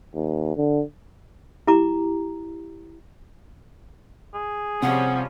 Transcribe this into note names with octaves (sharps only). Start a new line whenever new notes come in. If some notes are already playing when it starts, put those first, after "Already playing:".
D#2
D3
E4 G4 A#5 D6
G#4
C3 F3 G3 C#4 F#5